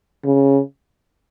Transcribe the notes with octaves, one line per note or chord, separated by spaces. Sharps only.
C#3